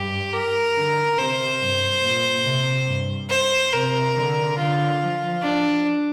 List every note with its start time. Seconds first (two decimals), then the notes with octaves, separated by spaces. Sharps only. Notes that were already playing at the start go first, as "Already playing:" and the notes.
Already playing: G2 G4
0.33 A#4
0.76 D3
1.18 C3 C5
1.61 G2
2.02 A#2
2.45 C3
2.87 G2
3.30 C5
3.72 C3 A#4
4.15 D3
4.57 D3 F4
5.00 F3
5.42 F3 D4